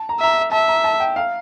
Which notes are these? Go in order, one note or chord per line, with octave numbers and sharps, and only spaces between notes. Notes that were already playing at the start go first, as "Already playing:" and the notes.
Already playing: A5
A#5
E5 A#5
A#5
E5 A5
A#5
A5
G5
F5